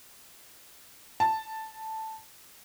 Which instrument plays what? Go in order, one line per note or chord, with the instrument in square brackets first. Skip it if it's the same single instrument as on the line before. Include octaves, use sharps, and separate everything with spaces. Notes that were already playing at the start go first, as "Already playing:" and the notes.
[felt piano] A5